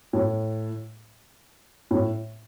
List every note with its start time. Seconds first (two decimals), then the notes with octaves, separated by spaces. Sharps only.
0.13 A2
1.91 A2